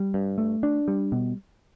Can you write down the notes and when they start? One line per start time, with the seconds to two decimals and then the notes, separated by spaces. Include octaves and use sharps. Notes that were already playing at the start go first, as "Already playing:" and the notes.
Already playing: G3
0.14 G2
0.38 A3
0.63 D4
0.88 G3
1.12 B2